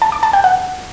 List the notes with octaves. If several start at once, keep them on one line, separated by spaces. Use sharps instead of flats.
A5
D6
A5
G5
F#5